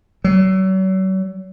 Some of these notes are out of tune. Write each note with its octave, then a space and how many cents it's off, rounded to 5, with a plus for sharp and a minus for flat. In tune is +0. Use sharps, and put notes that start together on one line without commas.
F#3 +40